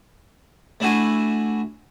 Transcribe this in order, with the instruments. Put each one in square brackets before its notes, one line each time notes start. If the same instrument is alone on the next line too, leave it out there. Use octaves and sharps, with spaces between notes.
[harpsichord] A3 D4 E4 F#4 G#5